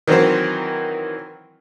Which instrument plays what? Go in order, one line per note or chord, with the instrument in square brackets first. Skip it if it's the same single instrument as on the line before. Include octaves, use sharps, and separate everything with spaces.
[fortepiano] D#3 E3 F#3 C4 A#4 C5